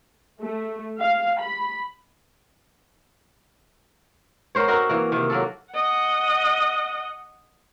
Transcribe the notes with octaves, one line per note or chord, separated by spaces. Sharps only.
A3
F5
B5
B3 A#4 C5 C#5
C4 D#4 F#4 A#4
E3 A#3
C3 D#3
F#3 A#3 A4
D#5 F#5